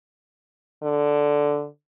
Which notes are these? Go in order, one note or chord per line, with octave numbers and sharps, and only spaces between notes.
D3